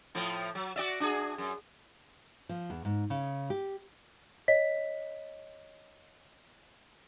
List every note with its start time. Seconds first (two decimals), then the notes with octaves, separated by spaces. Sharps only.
0.15 A2 F3
0.55 F#3
0.76 F#4 D5 E5
1.00 D4 F#4 G#4
1.38 F#2
2.49 F3
2.70 E2
2.85 G#2
3.10 C#3
3.50 G4
4.48 C#5 D#5 B6